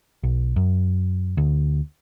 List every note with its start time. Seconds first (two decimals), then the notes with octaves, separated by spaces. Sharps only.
0.23 B1
0.56 F#2
1.37 D2